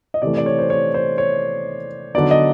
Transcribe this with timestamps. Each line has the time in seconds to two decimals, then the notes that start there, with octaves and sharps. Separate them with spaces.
0.14 D#5
0.22 C3 E3 A3 D5
0.37 D5
0.46 C#5
0.59 C5
0.70 C#5
0.94 C5
1.18 C#5
2.15 D3 F#3 B3 D#4 D5
2.31 D#5